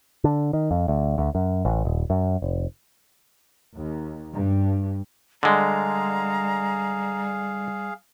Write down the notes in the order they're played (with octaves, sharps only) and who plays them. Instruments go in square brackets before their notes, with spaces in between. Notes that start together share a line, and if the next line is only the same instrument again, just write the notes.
[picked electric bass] D3
D#3
F2
D2
D2
F#2
A1
D#1
F#2
F1
[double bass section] D#2
G2
[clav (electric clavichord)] D3 G#3 [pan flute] G3 [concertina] G#4 F5 [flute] A#5